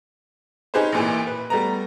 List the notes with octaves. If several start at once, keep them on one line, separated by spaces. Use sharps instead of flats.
C#4 D#4 G4 G#4 B4 C5
A1 A#2 E3
B4
G3 A3 B3 A#5